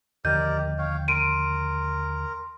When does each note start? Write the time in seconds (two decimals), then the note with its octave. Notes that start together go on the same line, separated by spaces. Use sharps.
0.25 D#2 D3 F3 G4 A#4 D5 D#5 G6
0.78 C#5 F5 G5
1.08 A#4 C6 D7 D#7